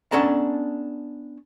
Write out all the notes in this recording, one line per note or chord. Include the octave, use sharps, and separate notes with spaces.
B3 C#4 D4 A4 A5 A#5